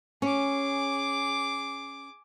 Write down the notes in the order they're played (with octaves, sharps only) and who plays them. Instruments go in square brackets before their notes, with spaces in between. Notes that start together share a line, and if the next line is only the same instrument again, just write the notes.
[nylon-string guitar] C#4 [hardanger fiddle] G#4 D6